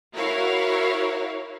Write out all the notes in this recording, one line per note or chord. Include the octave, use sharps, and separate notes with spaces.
E4 F#4 A#4 C#5 F5